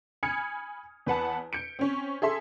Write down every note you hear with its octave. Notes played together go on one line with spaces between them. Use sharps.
G#5 B5 D#6 F6 G#6 C#7
E2 B4 F#5 A5
G6 C#7 D7
C4 C#4
G#4 A4 E5 C6